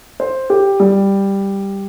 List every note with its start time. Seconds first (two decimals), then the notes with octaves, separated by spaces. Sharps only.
0.20 C5
0.50 G4
0.80 G3